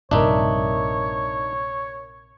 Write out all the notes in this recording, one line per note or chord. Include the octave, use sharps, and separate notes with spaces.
A#1 G2 C3 D4 D#4 A#4 C#5 E5